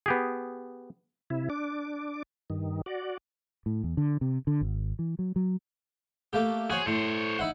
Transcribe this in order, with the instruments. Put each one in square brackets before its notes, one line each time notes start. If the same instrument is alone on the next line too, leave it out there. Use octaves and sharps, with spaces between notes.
[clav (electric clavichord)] B3 G4 G#4
[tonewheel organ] C3 E4
D4 D6
G2 D#3
F#4 D5
[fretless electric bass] A2
E2
D3
C3
D3
G#1
E3
F#3
F#3
[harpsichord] A3 A#3 G4
[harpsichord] F#4 C5 C#5 [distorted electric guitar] G#4
[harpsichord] A2 [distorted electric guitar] C5 C#5
[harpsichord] D#4 E4 F#5